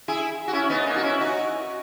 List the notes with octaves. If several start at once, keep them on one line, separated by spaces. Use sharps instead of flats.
E4 G#4
F#4
C#4 E4
B3 D#4
A#3 C#4
F#4
C#4 E4
D#4 F#4